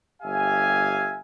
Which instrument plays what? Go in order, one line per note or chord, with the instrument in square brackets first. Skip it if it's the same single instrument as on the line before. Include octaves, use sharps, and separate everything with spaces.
[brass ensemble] G1 G4 E5 F5 G#5